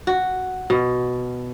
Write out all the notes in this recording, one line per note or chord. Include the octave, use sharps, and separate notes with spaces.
F#4
B2